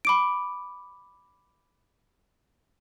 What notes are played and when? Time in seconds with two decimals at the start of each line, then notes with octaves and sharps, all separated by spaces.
0.05 B5 D6 D7